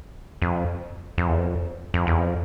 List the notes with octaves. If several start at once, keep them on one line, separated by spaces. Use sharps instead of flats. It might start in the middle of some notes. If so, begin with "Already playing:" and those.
F2
F2
E2
F2
F2
E2
F2